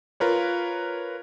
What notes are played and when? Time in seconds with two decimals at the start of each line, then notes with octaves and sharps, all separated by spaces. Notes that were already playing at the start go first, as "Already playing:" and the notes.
0.20 F4 A#4 B4 C#5